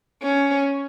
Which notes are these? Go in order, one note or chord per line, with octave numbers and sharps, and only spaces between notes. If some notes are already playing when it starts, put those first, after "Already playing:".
C#4